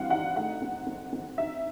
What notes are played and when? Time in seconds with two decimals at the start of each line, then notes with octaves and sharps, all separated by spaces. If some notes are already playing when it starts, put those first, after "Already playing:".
Already playing: E3 G3 C4 F5 F#5
0.10 D#4 F#5
0.36 A3 F#5
0.62 C4
0.87 C4
1.13 C4
1.38 D#4 E5